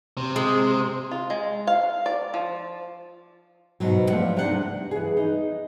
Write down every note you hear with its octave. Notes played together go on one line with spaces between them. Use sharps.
C3
C3 G#3
F4
G#3
F5
D5
F3
G#2 B2 F#3
F3 A3 B3 D4 F#5
C3 G3 D4 D#4 F#5
F#5
E3 G#4
D#4